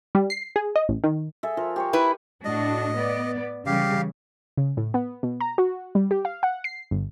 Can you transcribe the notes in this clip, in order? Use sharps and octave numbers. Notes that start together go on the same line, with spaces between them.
G3
C7
G#4
D#5
A1
D#3
G#4 A4 E5
F3 A#4
G4 C5 C#5
E4 B4
A2 D4 F#4 D#5
B3 D5
C#3 E3 G3 G4 F5
C#3
A2
B3
B2
A#5
F#4
G3
G4
F5
F#5
C7
G1